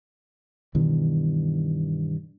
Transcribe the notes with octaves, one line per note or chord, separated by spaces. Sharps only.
G2 B2 D#3 E3